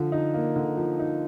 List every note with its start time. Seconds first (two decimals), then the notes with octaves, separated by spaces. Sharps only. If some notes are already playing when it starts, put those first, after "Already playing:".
Already playing: D3 F3
0.12 D#4
0.34 A#3
0.56 D3
0.77 F3
0.99 D#4